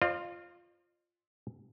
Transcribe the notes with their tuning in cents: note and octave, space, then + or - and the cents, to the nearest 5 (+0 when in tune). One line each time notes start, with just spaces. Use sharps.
F4 +0 C5 +35 D#5 -45